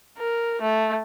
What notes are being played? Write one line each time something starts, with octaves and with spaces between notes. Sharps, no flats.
A#4
A3